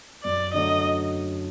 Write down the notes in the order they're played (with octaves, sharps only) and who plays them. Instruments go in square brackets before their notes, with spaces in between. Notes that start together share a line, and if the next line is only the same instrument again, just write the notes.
[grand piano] F#2 [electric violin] D5
[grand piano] D3 F#3 A3 [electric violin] D#5